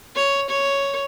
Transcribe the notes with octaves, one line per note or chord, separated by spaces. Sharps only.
C#5
C#5